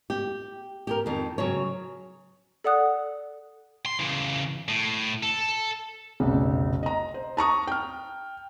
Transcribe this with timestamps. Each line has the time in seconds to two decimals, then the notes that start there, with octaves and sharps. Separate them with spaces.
0.10 G4
0.87 G4 G#4 A#4
1.06 F2 D#3
1.38 C#3 F#3 C#5
2.64 A4 D5 F#5 D#6 F#6
3.86 C6
4.00 C#3 E3
4.68 A2
5.23 A4
6.20 F1 B1 C#3
6.83 D#5 A#5
7.14 C5
7.37 A5 A#5 C#6 D#6
7.67 G5 F6